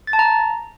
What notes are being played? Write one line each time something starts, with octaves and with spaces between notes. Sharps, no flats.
A6
A5
A#5